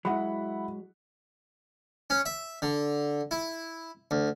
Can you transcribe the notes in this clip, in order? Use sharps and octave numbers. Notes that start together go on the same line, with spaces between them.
F#3 G#3 E4 F#5 B5
C#4
E5
D3
E4
D2